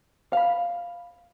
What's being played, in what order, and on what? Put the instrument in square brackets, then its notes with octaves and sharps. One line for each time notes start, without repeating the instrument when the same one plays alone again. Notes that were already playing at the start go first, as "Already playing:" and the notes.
[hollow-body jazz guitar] F5 B5